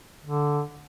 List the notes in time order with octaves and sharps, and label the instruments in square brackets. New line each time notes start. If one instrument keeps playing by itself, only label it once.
[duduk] D3